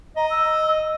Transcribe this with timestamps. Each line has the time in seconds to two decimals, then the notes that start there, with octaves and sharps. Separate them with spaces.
0.16 D#5 A#5
0.30 E6